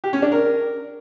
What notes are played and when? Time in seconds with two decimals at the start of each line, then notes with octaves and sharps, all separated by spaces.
0.04 G4
0.13 C#4
0.22 D4
0.32 A#4